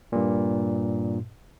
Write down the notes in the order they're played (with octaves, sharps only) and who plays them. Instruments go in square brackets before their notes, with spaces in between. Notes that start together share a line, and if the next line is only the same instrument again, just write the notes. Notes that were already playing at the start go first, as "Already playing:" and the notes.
[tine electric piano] G2 A#2